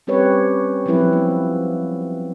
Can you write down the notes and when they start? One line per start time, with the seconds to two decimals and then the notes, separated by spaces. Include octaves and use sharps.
0.07 G3 C4 C#4 G4 B4 C#5
0.86 F3 F#3 C4 E4 B4
1.13 B3